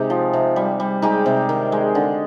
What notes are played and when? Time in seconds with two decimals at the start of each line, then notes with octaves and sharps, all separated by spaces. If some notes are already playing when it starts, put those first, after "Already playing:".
Already playing: C3 G#3 D#4 G4
0.10 F3
0.33 C3
0.56 G3
0.80 G3
1.02 G#3 D#4 G4
1.26 C3
1.49 D#3
1.72 G#3
1.95 D3